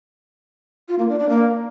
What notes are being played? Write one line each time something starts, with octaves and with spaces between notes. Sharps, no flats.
F4
A#3
D4
D4
A#3